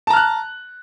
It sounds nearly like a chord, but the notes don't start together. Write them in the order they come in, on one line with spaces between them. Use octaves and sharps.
A5 A#5 F6 F#6